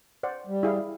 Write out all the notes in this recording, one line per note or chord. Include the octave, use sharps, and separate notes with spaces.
C5 D5 F#5
G3
E4 G#4 F5